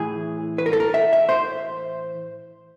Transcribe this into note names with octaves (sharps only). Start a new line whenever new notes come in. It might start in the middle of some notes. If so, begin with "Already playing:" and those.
Already playing: A2 E3 G#4
B4
A#4
A4
A#4
E5
E5
C5